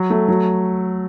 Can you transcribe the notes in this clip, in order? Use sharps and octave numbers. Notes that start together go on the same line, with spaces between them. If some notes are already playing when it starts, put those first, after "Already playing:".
Already playing: F#3
A3
F#3